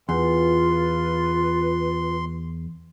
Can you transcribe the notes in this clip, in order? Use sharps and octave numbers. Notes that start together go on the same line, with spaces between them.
E2 F4 B4 C6